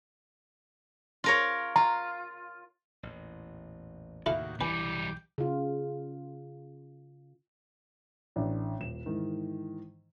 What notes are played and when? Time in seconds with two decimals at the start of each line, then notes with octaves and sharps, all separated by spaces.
1.24 F4 A#4 C#5
1.76 F4 A#5
3.03 A1 E2 A#2
4.26 D#2 A2 C3 D#3 E4 F#4 A4 F5
4.61 B1 E3 G3 G4 B4 G#5 D6
5.38 C#3 F4
8.36 A1 D4
8.80 D#1 E7
9.06 G#2 D#3 E3